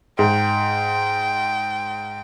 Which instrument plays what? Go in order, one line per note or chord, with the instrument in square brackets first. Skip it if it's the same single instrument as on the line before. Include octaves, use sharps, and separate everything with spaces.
[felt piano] G#2 [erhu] G5